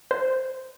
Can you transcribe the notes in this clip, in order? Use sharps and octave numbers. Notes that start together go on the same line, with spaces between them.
C5